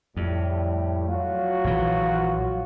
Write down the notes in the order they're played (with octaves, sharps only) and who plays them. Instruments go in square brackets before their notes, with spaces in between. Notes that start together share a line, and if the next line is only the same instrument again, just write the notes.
[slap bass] F2 [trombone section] A2 G3
[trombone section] F#3 F4 F#4
[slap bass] A#1 E3